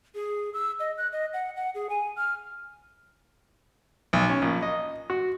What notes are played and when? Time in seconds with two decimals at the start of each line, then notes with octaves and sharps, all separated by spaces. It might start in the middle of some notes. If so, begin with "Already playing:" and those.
0.15 G#4
0.54 E6
0.80 D#5
0.98 F#6
1.12 D#5
1.33 F#5
1.56 F#5
1.75 G#4
1.90 G#5
2.17 F6
4.13 B1
4.29 C#4
4.42 A#1
4.62 D#5
5.10 F#4